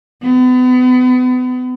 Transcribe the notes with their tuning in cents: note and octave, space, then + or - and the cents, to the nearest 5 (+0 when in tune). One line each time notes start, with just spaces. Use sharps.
B3 +35